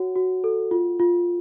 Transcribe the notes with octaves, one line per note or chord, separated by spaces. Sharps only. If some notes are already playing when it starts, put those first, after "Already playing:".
Already playing: F#4 C#5 F#5
F#4
A4
F4
F4